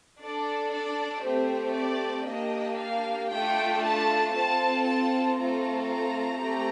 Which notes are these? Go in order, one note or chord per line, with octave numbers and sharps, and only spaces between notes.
D4 A4 D5
D5
A3 C4 G4 C5
D5
A#3 D4 G4 D#5
F5
A3 D4 F4 A4 G5
A5
C4 F4 A4 A5
A5
A3 C4 F4 A4 A#5
A#5
A3 C4 G4